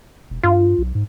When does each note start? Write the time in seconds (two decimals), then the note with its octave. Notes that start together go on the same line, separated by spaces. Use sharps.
0.30 E1
0.43 G2 F4
0.78 B1
0.95 G#2